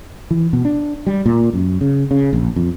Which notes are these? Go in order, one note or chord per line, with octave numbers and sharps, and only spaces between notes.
E3
B2
D4
G3
A#2
F#2
C#3
C#3
A#1
F2